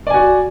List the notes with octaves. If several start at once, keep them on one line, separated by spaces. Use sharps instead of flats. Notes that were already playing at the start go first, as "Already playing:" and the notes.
F#4 D5 G#5